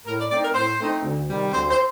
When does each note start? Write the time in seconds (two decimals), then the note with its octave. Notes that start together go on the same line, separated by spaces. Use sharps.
0.06 A2 A#4
0.18 D5
0.30 A3 C4 D#4 D5
0.43 A#4
0.54 A2 C5
0.79 A3 C4 D#4
1.03 D2
1.28 C3 D#3 G3
1.52 D2 C5
1.70 C5